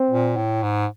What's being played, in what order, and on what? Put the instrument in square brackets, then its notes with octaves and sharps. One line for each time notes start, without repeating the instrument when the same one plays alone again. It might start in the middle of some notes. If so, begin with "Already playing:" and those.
Already playing: [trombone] C4
[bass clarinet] A#2
A2
G#2